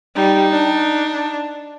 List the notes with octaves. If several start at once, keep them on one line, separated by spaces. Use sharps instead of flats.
G3 D#4
D4